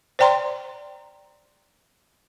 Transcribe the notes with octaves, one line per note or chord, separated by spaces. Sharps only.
C5 D5 G5 A#5 C6